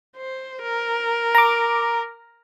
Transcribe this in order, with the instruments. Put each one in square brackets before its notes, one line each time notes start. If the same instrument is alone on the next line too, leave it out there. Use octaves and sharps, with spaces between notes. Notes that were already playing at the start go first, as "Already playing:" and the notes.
[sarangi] C5
A#4
[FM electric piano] A#5 D6